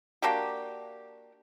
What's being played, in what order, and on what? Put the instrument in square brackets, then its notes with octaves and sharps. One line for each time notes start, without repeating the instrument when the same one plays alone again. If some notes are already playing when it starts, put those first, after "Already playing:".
[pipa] A#3 D4 F#4 G4